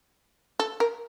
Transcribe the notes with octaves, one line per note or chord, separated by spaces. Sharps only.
A4
A#4